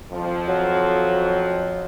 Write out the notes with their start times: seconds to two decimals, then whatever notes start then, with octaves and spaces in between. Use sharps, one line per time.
0.12 F2 F3
0.48 F#3